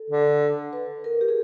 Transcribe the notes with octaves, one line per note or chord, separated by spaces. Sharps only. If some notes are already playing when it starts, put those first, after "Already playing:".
Already playing: A4
D3
B4
A#4
G4
G#4